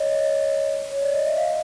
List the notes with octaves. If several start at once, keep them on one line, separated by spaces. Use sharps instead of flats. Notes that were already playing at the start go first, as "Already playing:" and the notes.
Already playing: C#5 D#5
C#5
D5
D#5
E5
D#5 F5